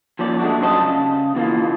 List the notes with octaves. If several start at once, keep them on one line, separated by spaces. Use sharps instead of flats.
D#2 F3 C#4 D5
G#3 A3 D4 F#4
F#2 C3 G3 C5 D#5 A5
C#3
B2 E3 A#3 F4